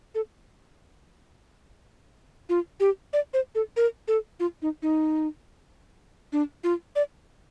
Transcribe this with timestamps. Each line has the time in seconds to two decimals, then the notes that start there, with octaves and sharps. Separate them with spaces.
0.15 A4
2.49 F4
2.80 G4
3.13 D5
3.34 C5
3.55 A4
3.77 A#4
4.08 A4
4.40 F4
4.62 D#4
4.82 D#4
6.33 D4
6.64 F4
6.96 D5